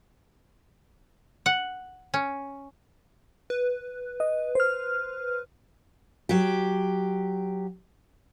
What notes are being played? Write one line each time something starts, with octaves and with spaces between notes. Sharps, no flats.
F#5
C#4
B4
D#5
C5 F6
F#3 G4